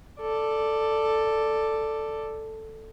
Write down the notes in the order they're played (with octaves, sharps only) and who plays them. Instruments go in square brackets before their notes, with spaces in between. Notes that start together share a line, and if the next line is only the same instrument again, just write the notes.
[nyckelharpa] A4 D5